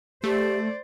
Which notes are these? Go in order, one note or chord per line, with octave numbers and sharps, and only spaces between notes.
A3 G4 C5 D5